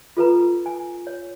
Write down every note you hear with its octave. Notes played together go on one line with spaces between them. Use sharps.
F4 A4 B4 A#5
G#5
C#5